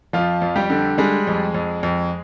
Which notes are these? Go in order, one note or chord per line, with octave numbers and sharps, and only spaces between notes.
F2 F3 F4
F2
G3 G4
D3
G3 G#3 G#4
F2
F2
F2